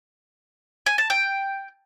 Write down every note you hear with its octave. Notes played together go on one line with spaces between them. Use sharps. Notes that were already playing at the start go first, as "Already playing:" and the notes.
G#5
A5
G5